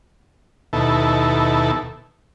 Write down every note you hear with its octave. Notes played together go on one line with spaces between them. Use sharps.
D#2 B2 E4 A4